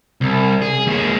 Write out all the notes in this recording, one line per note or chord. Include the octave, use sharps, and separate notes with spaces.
C2
G#4
D#2 G#3